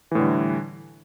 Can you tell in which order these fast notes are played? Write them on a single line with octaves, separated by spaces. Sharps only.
E3 A2 D3 G3